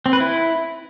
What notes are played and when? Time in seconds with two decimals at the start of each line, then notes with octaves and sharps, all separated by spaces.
0.06 C4
0.13 B4
0.20 E4